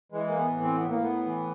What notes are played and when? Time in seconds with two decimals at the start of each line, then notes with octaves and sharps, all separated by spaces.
0.12 E3 G#3
0.28 A#3
0.38 B3
0.50 A2
0.63 C4
0.76 B3
0.88 A2 A#3
1.03 B3
1.26 E3